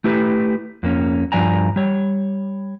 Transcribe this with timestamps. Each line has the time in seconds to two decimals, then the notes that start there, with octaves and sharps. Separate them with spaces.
0.04 A3 E4 G4 B4
0.83 F2 A#3 C#4
1.32 G2 F3 D5 G#5 A#5
1.76 G3 C#5